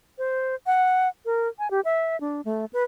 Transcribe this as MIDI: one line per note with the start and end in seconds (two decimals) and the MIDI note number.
0.18 0.55 72
0.67 1.09 78
1.26 1.48 70
1.59 1.70 80
1.71 1.81 67
1.85 2.19 76
2.21 2.41 62
2.45 2.65 57
2.73 2.84 71